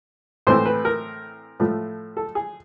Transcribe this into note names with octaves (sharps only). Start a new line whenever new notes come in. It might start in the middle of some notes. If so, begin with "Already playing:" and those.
A2 E3 A3 C4 C5
B4
A#4
A2 F3 A3
A4
G#4